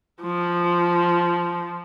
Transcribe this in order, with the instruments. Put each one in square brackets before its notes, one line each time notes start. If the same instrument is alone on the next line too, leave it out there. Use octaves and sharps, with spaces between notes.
[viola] F3